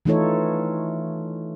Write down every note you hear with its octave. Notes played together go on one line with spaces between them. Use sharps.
E3 A3 D#4 F4 A4 C#5